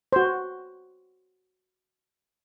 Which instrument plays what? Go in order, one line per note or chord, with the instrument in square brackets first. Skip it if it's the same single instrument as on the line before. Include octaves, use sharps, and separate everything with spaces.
[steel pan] F#4 C5